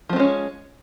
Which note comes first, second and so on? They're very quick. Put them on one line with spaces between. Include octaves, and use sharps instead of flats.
F3 C4 G#3 C#4